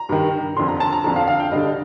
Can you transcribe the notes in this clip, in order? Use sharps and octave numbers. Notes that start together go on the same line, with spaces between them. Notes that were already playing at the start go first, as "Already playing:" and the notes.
Already playing: A#5
G2 D#3
F2 D3 C6
A#5
A5
A#5
F2 D3 A5
F5
F5
G5
G2 D3 D#5